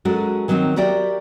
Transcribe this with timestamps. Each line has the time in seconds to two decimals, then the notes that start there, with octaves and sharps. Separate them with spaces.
0.05 F#3 G#3 C#4 F#4 A4 A#4
0.48 D#3 F#3 G3 C4 D#4
0.76 F#4 G4 A#4 D5 E5 G5